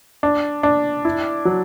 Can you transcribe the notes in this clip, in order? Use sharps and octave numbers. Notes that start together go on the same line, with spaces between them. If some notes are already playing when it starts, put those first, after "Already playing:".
D4
D4
E4
F#3